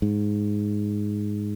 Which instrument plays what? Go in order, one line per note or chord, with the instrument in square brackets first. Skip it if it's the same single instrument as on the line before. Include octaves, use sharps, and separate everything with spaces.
[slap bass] G#2